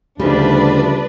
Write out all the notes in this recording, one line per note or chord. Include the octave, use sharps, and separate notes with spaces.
D2 C#3 F3 G3 D4 D#4 B4 D5